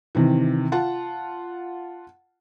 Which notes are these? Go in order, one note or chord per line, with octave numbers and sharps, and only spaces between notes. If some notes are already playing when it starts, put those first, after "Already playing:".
C3 D#3 E3
F4 F#5 A5